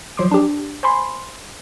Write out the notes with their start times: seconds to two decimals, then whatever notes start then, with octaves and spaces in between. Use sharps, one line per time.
0.17 F3 F#3 C6 D6
0.31 D4 G4
0.83 C5 G#5 B5 C6